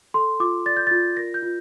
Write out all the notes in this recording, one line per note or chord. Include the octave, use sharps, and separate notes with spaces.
A4 C6
F4 D6
D5 A6
G6
F4 A6
A#4 A#6
G6
F4